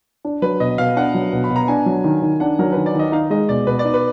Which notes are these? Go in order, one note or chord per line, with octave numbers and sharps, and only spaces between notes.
D4
F#3 B4
B2 D#5
B2 F5
D4 F#5
F#3
B2
B5
B2
A#5
D4 G#5
F#3
D#3
D#3
D4 F#5
F#3 A#4
D#3 B4
D5
D#3 D#5
D#4 F5
G#3 D#5
B2 D5
B2 B4
D5
D#4
B4